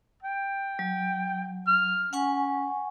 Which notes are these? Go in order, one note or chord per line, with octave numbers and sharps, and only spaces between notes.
G5
F#3
F6
C#4 F#5 G#5 C#6